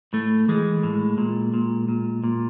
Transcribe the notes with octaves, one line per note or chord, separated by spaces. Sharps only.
A2 A3
E3 G#3
A2
A#2
A#2
A#2
A#2